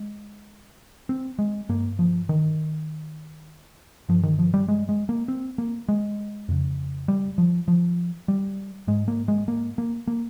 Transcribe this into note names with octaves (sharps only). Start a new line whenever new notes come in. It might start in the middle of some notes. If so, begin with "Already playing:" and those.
Already playing: G#3
C4
G#3
G2 A#3
F3
D#3
G2 F3
D#3
F3
G3
G#3
G#3
A#3
C4
A#3
G#3
F2 C#3
G3
F3
F3
G3
G#2 G#3
A#3
G#3
A#3
A#3
A#3